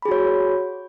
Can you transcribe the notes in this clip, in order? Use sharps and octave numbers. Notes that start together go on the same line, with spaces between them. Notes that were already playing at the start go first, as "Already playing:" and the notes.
F#4 G#4 C#5 B5